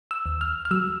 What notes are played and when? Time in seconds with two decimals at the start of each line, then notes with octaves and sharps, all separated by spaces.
0.11 E6
0.26 D#2
0.41 F6
0.65 F6
0.71 F#3 E6